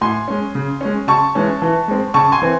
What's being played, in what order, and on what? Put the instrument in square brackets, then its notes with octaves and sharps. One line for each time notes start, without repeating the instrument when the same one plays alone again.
[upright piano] A2 G#5 C6
G#3 C#4
C#3
G#3 C#4
C#3 A5 C#6
E3 G#3 C#4
E3
G#3 C4
C#3 A5 C#6
G#5 C6
E3 C4